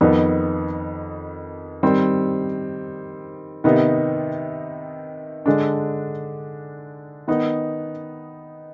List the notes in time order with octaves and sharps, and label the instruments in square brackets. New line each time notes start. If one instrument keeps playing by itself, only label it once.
[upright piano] F2 D#3 B3 D#4
D#3 G3 C4
C3 D#3 B3 D#4
D3 G#3 D4
D#3 B3 D#4